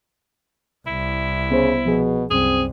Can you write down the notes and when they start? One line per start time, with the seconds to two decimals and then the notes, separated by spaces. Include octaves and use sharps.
0.87 C2 E4
1.51 C#3 B3 C5
1.86 B2 F3 G#4
2.30 C2 F#2 C4 G#4